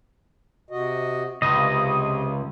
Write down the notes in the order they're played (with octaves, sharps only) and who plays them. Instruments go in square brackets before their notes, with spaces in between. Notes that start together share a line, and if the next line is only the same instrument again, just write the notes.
[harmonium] C3 F#4 D#5
[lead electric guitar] C#2 [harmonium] C3 [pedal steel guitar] D#5